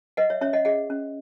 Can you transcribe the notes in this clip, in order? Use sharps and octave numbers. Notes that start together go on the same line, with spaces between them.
B4 D#5 F#5
C#5 E5
C#4 C#5 E5
D#5 F#5
G#4 D#5 F#5
C#4